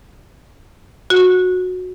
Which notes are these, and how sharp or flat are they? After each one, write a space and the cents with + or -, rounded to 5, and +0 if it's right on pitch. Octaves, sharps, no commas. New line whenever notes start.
F#4 -15